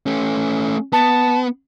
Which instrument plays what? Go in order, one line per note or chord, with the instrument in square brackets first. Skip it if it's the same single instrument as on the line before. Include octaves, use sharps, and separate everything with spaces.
[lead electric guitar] A3 C#4
[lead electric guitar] B3 [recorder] A5